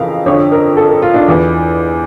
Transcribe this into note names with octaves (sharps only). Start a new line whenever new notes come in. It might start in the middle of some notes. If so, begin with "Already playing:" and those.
Already playing: F2 C#3 E3 A#4 F5
F2 D3 C#5
A#4
A4
A#4
F4
D4
E2 E3